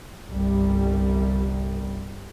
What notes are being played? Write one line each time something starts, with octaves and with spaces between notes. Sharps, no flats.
G1 C2 G3